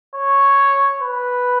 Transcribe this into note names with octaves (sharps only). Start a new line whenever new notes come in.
C#5
B4